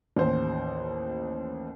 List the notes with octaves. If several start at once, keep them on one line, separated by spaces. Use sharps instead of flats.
A1 D#2 C5